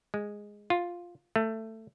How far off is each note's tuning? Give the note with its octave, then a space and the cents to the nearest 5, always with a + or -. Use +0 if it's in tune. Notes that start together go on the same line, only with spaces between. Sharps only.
G#3 -5
F4 +5
A3 +15